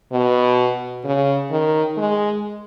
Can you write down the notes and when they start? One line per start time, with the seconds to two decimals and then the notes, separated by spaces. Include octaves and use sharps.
0.12 B2
1.05 C#3
1.51 D#3
1.97 G#3